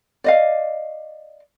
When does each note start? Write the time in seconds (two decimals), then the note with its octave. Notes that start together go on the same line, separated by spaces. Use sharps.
0.24 D5 D#5 F5